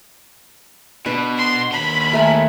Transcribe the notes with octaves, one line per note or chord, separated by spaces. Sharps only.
B2 D4 B4
C6
D#2 B5 C6
A3 A#4 G#5